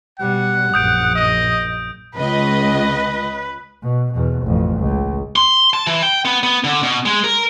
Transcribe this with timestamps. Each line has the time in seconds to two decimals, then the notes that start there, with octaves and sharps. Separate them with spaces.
0.19 B2 G3 F#5
0.74 A#1 F#2 D#6 G6 D7
1.15 D#5
2.16 C#2 B4 D#5
3.82 B2
4.12 E2 B2
4.43 A1 F2
4.78 C#2
5.36 C6
5.74 A5
5.87 E3
6.02 G5
6.25 B3
6.43 B3
6.64 D3
6.83 B2
7.06 G#3
7.24 A#4